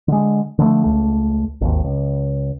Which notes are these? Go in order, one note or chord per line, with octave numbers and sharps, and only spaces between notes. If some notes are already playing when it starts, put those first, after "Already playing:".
D3 G#3
D3 F3 F#3 A3
C#2 A3
G#1 D#2
C#2